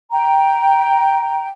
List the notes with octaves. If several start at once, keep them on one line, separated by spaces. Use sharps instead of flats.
G5 A#5